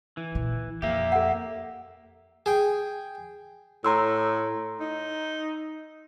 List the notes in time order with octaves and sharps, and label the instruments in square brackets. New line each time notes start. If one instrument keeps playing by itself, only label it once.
[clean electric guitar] E3
[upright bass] A#2
[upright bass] F2 [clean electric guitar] A#3 G4 [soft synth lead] E5
[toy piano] A4 F#5
[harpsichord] G#4 G5
[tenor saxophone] A2 [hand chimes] A#5 C6 E6
[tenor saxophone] D#4